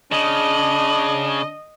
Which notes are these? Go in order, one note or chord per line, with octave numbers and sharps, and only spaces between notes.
C#3 D4 D#5